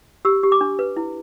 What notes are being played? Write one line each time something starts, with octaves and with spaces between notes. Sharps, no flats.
G4 E6
G4
D6
D4
B4
E4